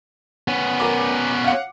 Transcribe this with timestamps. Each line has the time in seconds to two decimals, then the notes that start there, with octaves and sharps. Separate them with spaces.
0.48 B3 C#4
0.80 A#4 D6
1.44 F5 F#5